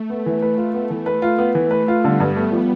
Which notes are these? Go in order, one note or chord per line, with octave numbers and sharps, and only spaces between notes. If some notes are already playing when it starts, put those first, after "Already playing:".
Already playing: A3
B3
E3
B4
F4
A3 B3
E3
B4
F4
B3
E3
B4
F4
D3 G3 B3
G2
G3 A3 B3
F3